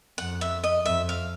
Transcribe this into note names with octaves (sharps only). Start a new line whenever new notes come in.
F2 F#5
E5
D#5
F2 E5
F5